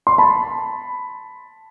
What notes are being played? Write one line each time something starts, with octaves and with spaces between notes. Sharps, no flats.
C6
A5 B5